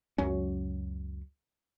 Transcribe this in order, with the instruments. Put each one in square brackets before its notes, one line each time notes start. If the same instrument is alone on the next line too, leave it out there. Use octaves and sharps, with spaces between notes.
[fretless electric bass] C#2 F#2 F#3 C#4